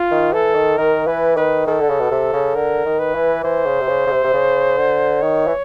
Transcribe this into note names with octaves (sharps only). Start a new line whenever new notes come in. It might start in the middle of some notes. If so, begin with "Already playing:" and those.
Already playing: F4
D#3
E3 A4
D#3
D#3 A#4
E3 B4
D#3 B4
D#3 A4
D3
C#3
B2
C3
C#3
D3 A#4
D#3
B4
E3
E3 C5
C#3
C3
C#3
C#3
C3
C3
C#3
D3
D#3 C#5
E3